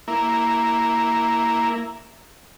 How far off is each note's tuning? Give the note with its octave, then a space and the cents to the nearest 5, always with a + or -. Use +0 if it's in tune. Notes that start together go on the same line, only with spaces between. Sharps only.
A#3 +0 E4 +0